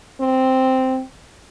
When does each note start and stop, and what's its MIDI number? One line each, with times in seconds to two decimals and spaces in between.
0.21 1.02 60